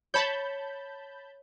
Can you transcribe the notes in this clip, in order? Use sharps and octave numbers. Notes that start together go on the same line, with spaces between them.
C#5 A5 B5 G6